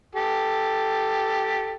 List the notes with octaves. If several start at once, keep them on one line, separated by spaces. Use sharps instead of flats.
G4 A4